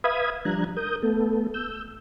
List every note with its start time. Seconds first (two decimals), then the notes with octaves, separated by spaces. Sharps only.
0.04 B4 E5 F5 B5 D#6 G#6
0.45 F3 G3 D4 A#5 F#6 G#6
0.77 A#4 D#6 G6
1.02 A3 B3 A4
1.54 E6 G6